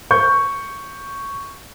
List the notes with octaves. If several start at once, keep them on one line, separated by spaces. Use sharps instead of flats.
C#6 G6